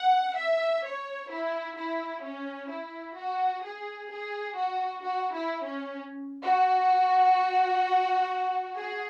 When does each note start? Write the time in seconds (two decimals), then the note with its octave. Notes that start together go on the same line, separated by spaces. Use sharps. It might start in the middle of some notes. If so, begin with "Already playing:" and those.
Already playing: F#5
0.37 E5
0.85 C#5
1.31 E4
1.78 E4
2.24 C#4
2.70 E4
3.17 F#4
3.64 G#4
4.11 G#4
4.56 F#4
5.04 F#4
5.34 E4
5.65 C#4
6.43 F#4
8.76 G#4